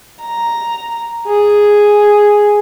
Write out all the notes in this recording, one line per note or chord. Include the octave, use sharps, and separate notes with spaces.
A#5
G#4